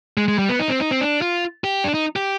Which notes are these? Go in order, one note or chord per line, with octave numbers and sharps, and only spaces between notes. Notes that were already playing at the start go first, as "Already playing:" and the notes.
G#3
G#3
G3
B3
D#4
C4
D#4
C4
D4
F4
G4
D4
D#4
G4